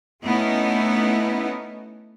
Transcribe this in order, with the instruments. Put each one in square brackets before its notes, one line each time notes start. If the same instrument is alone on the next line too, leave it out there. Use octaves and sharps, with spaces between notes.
[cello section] A3 B3 C#4 D#4 E4